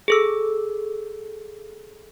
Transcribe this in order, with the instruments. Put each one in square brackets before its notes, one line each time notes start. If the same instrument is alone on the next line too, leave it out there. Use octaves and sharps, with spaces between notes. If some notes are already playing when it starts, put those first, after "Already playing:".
[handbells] G#4 A4 E6